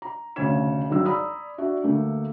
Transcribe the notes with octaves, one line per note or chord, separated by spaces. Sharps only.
A#5
F1 D2 C#3 C#5 G#6 E7
G#1 G#2 D#3 F#3 E6
D5 A#5 B5 D#6 E6
D4 F#4 E5
D2 A3 A#3